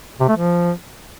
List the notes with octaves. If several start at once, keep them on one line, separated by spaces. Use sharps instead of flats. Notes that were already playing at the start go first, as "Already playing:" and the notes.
C3
A3
F3